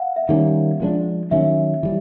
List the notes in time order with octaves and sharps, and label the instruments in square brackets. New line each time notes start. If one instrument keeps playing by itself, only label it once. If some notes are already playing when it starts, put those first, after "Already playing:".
Already playing: [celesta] F5 F#5
E5
[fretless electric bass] D#3 G3 A#3 C#4
F3 G#3 B3 D4
[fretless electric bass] D#3 F#3 A#3 C#4 [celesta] E5
[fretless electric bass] E3 G3